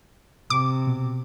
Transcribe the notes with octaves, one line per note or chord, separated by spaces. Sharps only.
C3 D6
B2